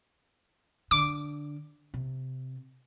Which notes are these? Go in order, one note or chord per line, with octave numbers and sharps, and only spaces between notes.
D3 D6
C3